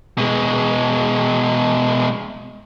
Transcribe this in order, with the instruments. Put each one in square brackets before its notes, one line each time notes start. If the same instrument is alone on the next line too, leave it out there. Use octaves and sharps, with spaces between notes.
[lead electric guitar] B2 G#3